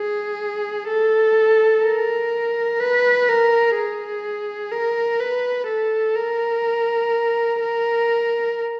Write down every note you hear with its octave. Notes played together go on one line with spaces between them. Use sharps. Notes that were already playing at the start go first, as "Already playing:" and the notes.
Already playing: G#4
A4
A#4
B4
A#4
G#4
A#4
B4
A4
A#4
A#4